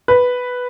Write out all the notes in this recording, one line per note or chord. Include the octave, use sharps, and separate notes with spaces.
B4